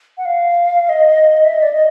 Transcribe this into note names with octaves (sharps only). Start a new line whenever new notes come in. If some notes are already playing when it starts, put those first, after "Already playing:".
F#5
F5
D#5
E5
D#5
D5
D#5